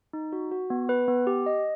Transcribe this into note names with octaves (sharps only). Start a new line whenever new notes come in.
D#4
F#4
F#4
B3
B4
B3
G4
D#5